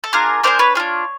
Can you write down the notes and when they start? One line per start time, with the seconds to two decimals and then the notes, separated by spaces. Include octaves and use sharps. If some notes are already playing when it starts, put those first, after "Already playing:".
0.04 A4
0.13 D4 F4 G#4 A#4
0.43 D4 F4 G#4 A#4 C5
0.59 B4 C#5
0.75 D4 F4 G#4